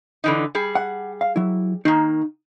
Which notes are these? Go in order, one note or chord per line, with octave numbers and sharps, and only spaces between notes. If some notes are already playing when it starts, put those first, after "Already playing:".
D3 E3 D#4
G3 G#4
F#5
F5
F#3 E4
D#3 A#3 D#4